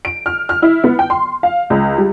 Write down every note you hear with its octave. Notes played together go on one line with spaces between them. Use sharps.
D7
F6
F6
E4
B3
G5
C6
F5
C#2
G3